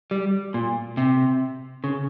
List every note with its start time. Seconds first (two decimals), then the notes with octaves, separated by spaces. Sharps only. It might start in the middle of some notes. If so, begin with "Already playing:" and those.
0.11 G3
0.54 A#2
0.97 C3
1.84 C#3